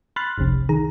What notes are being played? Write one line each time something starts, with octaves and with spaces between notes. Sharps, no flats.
B5 C6 F6 F#6 A6
G1 C2 F2 C3
D#3 G#4 A#5